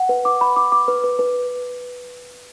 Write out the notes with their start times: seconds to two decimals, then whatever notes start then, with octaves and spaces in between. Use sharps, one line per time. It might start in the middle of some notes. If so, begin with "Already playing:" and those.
Already playing: F#5
0.09 B4
0.25 D6
0.41 B5
0.56 D6
0.72 D6
0.88 B4
1.04 B4
1.19 B4